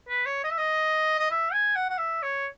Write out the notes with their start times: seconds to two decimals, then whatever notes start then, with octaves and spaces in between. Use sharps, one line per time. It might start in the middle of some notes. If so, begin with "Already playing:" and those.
0.09 B4
0.26 C#5
0.44 D#5
0.50 E5
0.58 D#5
1.19 D#5
1.30 E5
1.53 G#5
1.76 F#5
1.90 F#5
1.98 E5
2.22 C#5